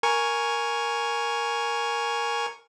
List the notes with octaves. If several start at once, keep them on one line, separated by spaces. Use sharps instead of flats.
A#4 G#5 C#6